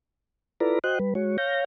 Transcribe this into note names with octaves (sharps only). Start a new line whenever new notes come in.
E4 F4 A4 B4 D5 A#5
F#4 C5 D#5 G5 F#6
G3 B4
G#3 F#4 C#5
C#5 F5 G6 A#6